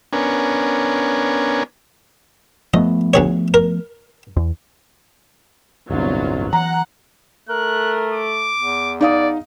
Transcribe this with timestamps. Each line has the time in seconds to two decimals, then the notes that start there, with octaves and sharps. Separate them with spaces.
0.13 B3 C#4 D4 A#4 G#5
2.74 F3 A3 B3 D#5
3.14 D2 G#4 C#5
3.54 A#4
4.37 E2
5.90 D1 G1 C2 F#3 B3 D4 F4
6.53 E3 F#5 A#5
7.49 A3 A#4 F#6
8.13 D6
8.57 E2
9.01 D#4 D5 F5 D#6